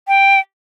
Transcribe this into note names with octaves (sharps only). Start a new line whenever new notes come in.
G5